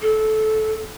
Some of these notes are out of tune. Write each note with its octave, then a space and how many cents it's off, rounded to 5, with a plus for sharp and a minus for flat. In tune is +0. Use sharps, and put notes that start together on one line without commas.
A4 -20